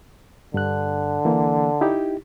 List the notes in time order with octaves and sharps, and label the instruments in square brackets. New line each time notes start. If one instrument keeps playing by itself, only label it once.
[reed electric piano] G2 F#6 [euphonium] D3
[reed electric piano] E3 A#3
D#4 E4 G4